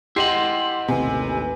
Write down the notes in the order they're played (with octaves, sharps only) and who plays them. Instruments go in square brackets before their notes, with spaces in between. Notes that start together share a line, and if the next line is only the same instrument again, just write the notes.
[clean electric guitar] E4 D#5 F#5 [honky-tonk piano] G4 C6 C7
[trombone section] A1 D#2 B4 [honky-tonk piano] C3 [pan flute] G#5